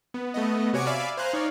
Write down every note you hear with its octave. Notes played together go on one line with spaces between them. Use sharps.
B3
A3 B3 D#5
C3 F#4 C#5 G#5 D6 C#7
D5 E5 F5 G#5 B5 D6
C5 F5 G#5 A#5 F#6
D#4 C#5 D5 F5